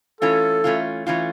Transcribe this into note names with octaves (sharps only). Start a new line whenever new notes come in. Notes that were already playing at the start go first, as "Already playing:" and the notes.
E3 A3 C#4 F4 A4
E3 A3 C#4 F4
E3 A3 C#4 F4